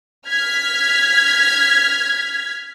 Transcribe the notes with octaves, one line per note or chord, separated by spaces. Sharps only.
F6 G#6 B6